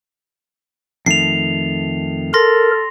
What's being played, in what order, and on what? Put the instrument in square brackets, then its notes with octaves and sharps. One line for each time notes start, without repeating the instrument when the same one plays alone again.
[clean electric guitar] F2 D#3 A3 [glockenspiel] C7 F7
[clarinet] A4 [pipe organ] A#4 [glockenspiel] C6 A#6